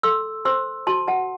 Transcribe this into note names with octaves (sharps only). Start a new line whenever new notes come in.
A4 C6 E6
C5 C6 E6
F#4 A5 C6
F#5 A5